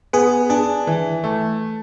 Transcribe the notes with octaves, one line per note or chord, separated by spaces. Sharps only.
B3 G#4
D4 G#4
E3
A3